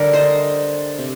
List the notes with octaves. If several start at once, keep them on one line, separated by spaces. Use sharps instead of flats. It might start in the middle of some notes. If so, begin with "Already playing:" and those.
Already playing: D3 G3 D4 G4 A#4
C5 D#5
C3